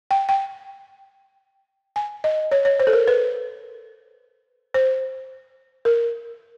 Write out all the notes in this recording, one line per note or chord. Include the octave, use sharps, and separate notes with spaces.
G5
G5
G#5
D#5
C#5
C#5
C5
A4
A#4
B4
C5
A#4